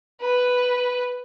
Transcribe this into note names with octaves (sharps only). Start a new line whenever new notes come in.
B4